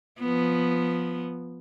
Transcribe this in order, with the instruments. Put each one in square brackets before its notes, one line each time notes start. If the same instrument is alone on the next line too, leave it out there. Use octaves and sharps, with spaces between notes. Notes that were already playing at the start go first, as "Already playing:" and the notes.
[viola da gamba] F3 B3